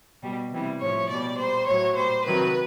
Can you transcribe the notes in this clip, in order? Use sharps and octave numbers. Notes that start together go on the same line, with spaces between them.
B2 G3
C3 E3 G3
A2 F3 C#5
B2 G3 D5
A#2 G3 C5
A2 F#3 C#5
A#2 G3 C5
C3 D#3 F#3 B4